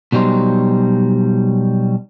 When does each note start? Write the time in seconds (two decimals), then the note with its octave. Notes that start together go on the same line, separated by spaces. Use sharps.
0.12 B2 F#3 G3 D#4 C5